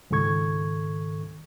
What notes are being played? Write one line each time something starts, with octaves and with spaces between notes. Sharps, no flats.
C#2 G#2 D#3 A4 C#6 G#6